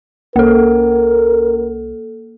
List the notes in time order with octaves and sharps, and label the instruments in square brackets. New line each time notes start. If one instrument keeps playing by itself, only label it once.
[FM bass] C2 [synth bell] A#3 A4 [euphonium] A#4